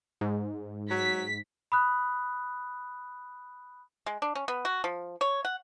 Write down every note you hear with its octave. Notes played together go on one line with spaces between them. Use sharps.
G#2
F#3 B6
B5 D#6 F#6
G#3
D4
C#4
B3
F#4
F3
C#5
F#5